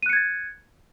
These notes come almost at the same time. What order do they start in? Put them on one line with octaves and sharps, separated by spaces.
D#7 F#6 C#7 G#6 A6